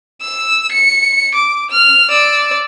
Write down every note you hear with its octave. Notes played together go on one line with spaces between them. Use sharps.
E6
C#7
D6
F6
D5 E6